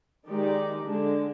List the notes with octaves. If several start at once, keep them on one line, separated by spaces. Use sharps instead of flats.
D#3 G#3 D#4 G4 D5
D3 G#3 D4